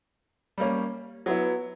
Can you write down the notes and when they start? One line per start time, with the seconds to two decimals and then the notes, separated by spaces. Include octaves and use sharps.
0.58 G3 A#3 C#4
1.26 F#3 B3 E4